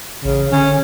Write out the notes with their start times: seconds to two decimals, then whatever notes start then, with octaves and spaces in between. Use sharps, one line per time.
0.24 A1 C#3
0.52 D3 C#4